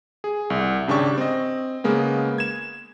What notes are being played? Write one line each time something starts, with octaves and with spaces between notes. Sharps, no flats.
G#4
C2
G#1 C#3 D4 G4 C#6
C4 D#5
C#3 G#3 A#3 B3
G#6 E7